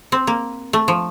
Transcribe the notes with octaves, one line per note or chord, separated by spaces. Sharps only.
C4
A#3
A3
F3